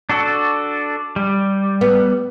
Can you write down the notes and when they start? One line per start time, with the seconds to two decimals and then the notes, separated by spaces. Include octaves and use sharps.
0.09 D4 F#4 A4
1.16 G3
1.81 B3